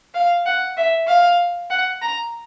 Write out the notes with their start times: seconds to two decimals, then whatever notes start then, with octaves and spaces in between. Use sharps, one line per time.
0.14 F5
0.46 F#5
0.77 E5
1.08 F5
1.70 F#5
2.02 A#5